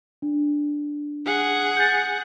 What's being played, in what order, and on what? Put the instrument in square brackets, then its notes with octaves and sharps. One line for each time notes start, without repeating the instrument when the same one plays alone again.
[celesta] D4
[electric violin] G#4 F#5
[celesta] G6 A6